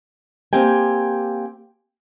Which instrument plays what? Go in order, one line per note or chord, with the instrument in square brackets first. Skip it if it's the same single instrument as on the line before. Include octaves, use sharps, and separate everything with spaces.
[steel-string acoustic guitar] A#3 C4 G4 G5 G#5